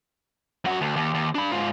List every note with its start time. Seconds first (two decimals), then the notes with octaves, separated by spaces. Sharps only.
0.65 F#2 F#4
0.81 D2
0.96 D#2
1.14 D#2
1.35 D4 B5
1.51 G#2 F4